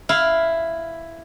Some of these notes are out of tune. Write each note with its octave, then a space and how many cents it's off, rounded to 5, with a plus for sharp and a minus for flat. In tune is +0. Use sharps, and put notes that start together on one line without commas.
E4 +5 F5 +0